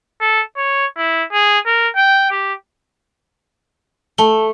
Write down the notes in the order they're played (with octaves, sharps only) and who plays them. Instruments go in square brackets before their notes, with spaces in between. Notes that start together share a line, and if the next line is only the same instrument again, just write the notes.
[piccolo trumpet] A4
C#5
E4
G#4
A#4
G5
G4
[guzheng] A3 [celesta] A5 G7